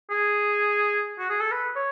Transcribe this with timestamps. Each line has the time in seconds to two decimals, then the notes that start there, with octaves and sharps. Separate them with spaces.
0.10 G#4
1.19 F#4
1.30 G#4
1.40 A4
1.51 B4
1.75 C#5